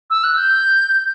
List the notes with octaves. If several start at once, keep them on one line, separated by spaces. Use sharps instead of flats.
E6
F#6
G6